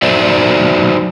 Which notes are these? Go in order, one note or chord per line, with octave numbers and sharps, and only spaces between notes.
F#3 D#4 C5 D5 E5